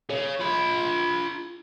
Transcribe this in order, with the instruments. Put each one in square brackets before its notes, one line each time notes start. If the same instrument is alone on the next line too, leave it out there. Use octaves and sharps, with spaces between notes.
[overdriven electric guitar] G#4 C#5
F4 B5